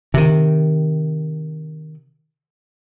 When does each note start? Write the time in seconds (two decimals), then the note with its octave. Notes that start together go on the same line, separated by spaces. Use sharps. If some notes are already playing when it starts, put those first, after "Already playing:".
0.14 C3 D#3